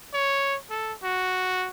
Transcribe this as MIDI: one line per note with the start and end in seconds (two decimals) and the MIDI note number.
0.14 0.56 73
0.70 0.93 69
1.03 1.68 66